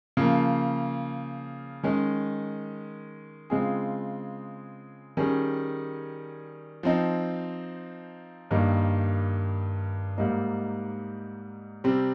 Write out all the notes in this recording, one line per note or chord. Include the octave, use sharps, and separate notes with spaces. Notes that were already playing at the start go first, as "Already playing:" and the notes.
C#3 F3 A#3
D#3 G#3 C#4
C#3 G#3 C4 F4 G#4
D#3 G3 C#4 G#4
F3 C4 D#4
G2 D#3 G3 A#3 D#4
G#2 G3 A#3 D#4
C3 G3 C4